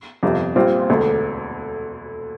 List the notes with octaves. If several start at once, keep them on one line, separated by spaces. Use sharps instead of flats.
G1 F2 C3 G3
A#1 A#2 G3 C4 F4
E1 D2 D3